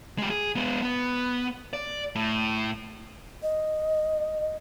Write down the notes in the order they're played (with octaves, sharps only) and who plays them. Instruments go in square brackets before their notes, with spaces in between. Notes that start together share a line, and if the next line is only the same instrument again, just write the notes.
[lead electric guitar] G#3 G4
G#4
G#3 B3
B3
D5
A2
[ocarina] D#5